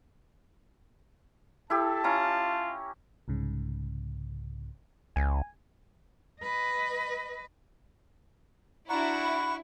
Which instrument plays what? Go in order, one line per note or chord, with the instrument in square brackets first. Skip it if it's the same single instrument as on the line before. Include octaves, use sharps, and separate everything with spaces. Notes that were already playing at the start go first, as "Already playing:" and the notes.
[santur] E4 G4 [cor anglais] A4 [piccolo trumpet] A5
[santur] C#4 A#5 [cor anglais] F4
[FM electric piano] C2 G#2 C#3
[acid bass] C#2 [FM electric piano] G#5
[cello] B4 D#5
[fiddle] D4 F#4 [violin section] E4 [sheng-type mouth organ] F#5 C#6 [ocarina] A#5
[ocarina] B5